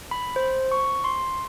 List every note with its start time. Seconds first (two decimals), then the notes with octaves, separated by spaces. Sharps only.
0.11 B5
0.36 C5
0.71 C#6
1.04 C6